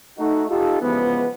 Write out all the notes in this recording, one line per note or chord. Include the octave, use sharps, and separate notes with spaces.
A3 D#4 F#4
D#4 F4 G4 A4
C#3 E3 F3 G#3 B3